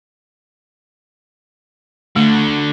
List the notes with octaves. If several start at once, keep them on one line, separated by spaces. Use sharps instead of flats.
D3 A3 F#4